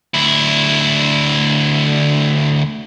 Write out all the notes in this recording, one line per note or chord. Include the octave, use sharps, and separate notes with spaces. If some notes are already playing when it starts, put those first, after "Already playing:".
D2 E4